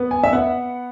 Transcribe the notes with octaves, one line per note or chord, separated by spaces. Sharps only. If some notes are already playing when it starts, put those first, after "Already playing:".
Already playing: B3
G#5
E5
B3 F#5